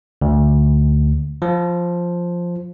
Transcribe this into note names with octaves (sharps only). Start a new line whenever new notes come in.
D2
F3